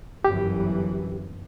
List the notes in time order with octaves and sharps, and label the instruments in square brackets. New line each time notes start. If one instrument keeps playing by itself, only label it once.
[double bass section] G1 F#2 E3 [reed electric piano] G4